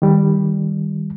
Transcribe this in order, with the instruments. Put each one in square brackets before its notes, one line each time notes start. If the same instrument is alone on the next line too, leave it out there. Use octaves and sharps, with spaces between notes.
[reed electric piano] D#3 G3